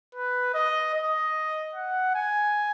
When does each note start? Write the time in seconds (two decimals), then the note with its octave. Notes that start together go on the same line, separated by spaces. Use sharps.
0.15 B4
0.54 D#5
0.95 D#5
1.75 F#5
2.15 G#5